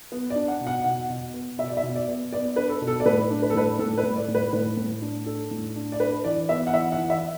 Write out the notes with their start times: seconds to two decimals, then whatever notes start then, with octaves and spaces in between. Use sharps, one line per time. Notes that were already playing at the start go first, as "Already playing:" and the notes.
0.12 B3
0.30 D5
0.36 D4
0.48 F#5
0.61 B2
0.67 F#5
0.84 B2 F#5
1.10 B2
1.34 B3
1.58 B2 E5
1.68 D5
1.77 E5
1.83 B2
1.96 D5
2.08 B3
2.33 B3 D5
2.56 D4 B4
2.69 A4
2.81 B2
2.87 A4
3.00 D5
3.06 A2 B4
3.30 D4
3.42 B4
3.50 A4
3.55 A2 B4
3.79 A2 A4
3.98 B4
4.03 A2
4.16 D5
4.28 A2
4.35 B4
4.53 A2 B4
4.77 A2
5.02 D4
5.26 D4 A4
5.51 A2
5.76 D4
5.92 D5
6.00 D4 B4
6.24 E3 D5
6.49 B3 E5
6.67 F#5
6.73 E3 E5
6.92 F#5
6.97 E3
7.10 E5